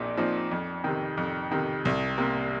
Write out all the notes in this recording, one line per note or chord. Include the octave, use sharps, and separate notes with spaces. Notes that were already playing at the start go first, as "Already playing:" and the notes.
Already playing: A#1 A#2 F3 C4 D#4
A#2 F3 C4 D#4
F2
C3 D#3
F2
C3 D#3
C2
C3 G3 A#3